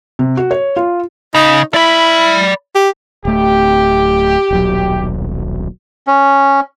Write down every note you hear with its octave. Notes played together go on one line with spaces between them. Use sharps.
C3
F#4
C#5
F4
C#3 D#4
E4 D5 B5
G4
D1 A3 G4
D#1 B1 F#3
C#4